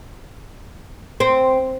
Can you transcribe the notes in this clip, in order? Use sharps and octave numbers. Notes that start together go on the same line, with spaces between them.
C4